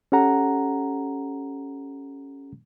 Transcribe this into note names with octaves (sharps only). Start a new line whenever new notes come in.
C#4 G4 A4 F#5 A#5